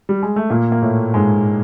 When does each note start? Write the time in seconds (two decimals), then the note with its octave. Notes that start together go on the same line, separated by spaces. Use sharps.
0.09 G3
0.23 G#3
0.36 A3
0.50 A#2 A#3
0.72 A#3
0.82 A2 A3
1.14 G#2 G#3